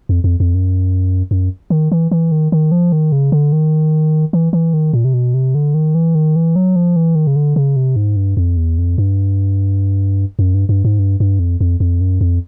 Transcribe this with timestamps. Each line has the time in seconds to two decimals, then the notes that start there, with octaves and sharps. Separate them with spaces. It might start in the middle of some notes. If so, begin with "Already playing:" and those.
0.09 F2
0.24 F2
0.40 F2
0.55 F#2
1.31 F#2
1.70 D#3
1.92 E3
2.11 E3
2.32 D#3
2.52 D#3
2.72 F3
2.92 D#3
3.12 C#3
3.32 D3
3.52 D#3
4.33 E3
4.53 E3
4.73 D#3
4.93 A#2
5.05 C3
5.14 B2
5.34 C3
5.55 D3
5.74 D#3
5.95 E3
6.15 D#3
6.36 E3
6.56 F#3
6.76 F3
6.96 E3
7.15 D#3
7.27 C#3
7.36 D3
7.56 C#3
7.76 C3
7.96 G#2
8.16 G2
8.37 F2
8.57 E2
8.78 F2
8.98 G2
10.39 F#2
10.54 G2
10.69 G2
10.85 G#2
10.99 G2
11.20 G2
11.39 F2
11.61 F2
11.80 F2
12.01 F#2
12.21 F2